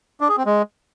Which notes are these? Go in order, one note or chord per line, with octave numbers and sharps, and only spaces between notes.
D4
G#4
C4
G#3